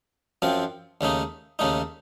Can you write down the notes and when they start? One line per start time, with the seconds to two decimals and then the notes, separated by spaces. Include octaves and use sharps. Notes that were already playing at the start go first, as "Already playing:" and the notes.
0.42 F#2 F3 C4 F4
1.01 D#2 C#3 A3 D#4
1.59 D#2 C#3 A3 D#4